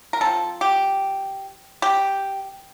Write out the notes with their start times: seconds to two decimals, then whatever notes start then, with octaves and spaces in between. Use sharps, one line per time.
0.13 A#4
0.21 F3 C4 A4
0.61 G4
1.82 G4